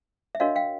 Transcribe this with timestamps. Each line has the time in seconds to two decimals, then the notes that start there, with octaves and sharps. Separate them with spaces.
0.35 E5
0.40 D4 F#4 A#4 C#5 D#5 F5
0.56 F5 G5